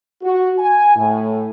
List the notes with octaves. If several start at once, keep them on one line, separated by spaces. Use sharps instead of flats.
F#4
G#5
A2